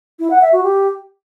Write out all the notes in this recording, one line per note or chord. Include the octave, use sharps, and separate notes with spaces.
E4
F#5
E5
F#4
G4